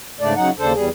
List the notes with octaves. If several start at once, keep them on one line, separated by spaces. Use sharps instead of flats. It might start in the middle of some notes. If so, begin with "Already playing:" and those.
G#2 C#3 A3 D4 D5
C#3 F#3 D#4 F#5
D#2 C#3 D4 A4 C5
E2 G3 G#4